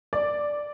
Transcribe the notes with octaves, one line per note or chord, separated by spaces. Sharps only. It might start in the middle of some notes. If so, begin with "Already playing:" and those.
D5